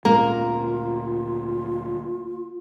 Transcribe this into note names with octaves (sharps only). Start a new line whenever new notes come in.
D2 A#2 A#3 C#4 F4 A#5